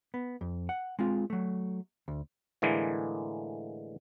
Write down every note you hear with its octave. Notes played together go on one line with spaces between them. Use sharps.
B3
F2
F#5
G#3 C4 F4
F#3 A3
D2
A2 D3 E3 G#3 A#3